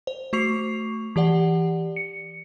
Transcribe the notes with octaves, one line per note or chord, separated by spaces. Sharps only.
C5
A3 F#4 C#6 C7 F7
E3 G4 D5 F#5
C#7